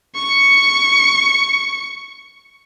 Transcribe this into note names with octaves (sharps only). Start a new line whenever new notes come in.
C#6 C#7